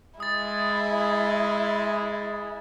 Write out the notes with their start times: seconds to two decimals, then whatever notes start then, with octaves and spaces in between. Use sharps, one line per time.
0.20 G#3 E4 D#6 A6